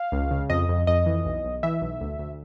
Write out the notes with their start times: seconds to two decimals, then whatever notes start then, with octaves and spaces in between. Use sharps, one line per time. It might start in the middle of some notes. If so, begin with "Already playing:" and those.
Already playing: F5
0.12 C#2
0.31 C#3
0.50 F2 D#5
0.69 F2
0.87 F2 D#5
1.06 E3
1.25 B1
1.45 B1
1.63 E3 E5
1.82 B1
2.01 D2
2.19 D2